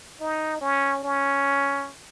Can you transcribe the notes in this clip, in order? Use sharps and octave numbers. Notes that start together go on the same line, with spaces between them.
D#4
C#4
C#4